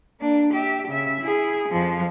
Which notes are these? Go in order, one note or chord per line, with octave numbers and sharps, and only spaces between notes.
A#3 D4
G4 E5
C#3 E5
E4 G#4
F2 F3